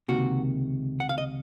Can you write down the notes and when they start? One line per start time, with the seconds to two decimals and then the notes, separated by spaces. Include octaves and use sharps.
0.08 C#2 C3 D#3 A#3 F#4
1.00 F#5
1.09 F5
1.18 D#5